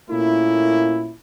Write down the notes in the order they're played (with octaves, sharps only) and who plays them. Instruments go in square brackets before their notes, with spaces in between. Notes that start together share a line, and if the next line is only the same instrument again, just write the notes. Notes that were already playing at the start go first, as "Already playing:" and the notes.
[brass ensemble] A#2 A3 A#3 C#4 E4